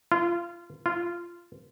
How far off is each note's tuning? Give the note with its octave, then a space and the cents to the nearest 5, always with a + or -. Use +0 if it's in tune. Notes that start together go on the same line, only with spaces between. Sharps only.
F4 -25
F4 -15